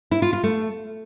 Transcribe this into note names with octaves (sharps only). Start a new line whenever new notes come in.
E4
F4
F4
A3